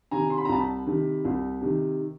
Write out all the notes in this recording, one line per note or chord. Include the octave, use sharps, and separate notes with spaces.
C3 D#3 G#5 A#5
C6
B5
A#5
C2 A5 B5
C3 D#3
C2
C3 D#3